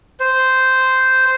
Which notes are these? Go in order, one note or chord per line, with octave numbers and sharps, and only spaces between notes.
C5